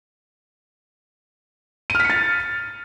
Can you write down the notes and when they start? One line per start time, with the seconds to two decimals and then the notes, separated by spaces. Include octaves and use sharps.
1.90 D#7
1.95 F6
2.00 B6
2.05 C#7
2.10 A6